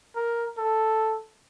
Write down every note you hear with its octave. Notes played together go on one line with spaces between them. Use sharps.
A#4
A4